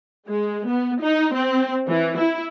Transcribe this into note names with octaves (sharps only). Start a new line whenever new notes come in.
G#3
B3
D#4
C4
E3
E4